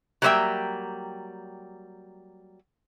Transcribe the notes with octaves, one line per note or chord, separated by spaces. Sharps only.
F#3 G3 A#3 C5 E5 G5